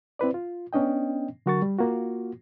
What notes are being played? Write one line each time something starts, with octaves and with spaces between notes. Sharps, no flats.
C4 E4 B4 D5
F4
B3 C#4 D4 D#5 G5
D3 F#3 F#4 A#4 C#6 A6
G3
A#3 F4 F#4